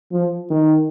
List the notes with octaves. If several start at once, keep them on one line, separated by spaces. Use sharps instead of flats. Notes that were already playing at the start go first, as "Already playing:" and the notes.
F3
D#3